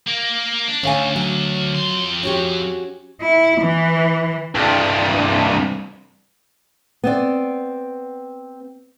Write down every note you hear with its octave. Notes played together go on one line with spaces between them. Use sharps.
A#3
D4
D2 C#4 F5 G#5
F#3
F2 C6
C#4 F#4 G4
E4
E3
C2 G2
B3 C4 D5